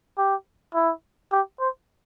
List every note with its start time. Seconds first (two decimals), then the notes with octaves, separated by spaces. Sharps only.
0.18 G4
0.74 E4
1.32 G4
1.60 C5